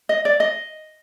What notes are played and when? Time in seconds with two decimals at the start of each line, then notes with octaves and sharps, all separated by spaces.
0.09 D#5
0.25 D5
0.40 D#5